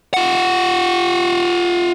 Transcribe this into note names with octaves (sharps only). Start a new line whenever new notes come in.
F4 F#5